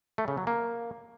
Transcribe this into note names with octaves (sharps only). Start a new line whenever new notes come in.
A3
C#3
F#3
A#3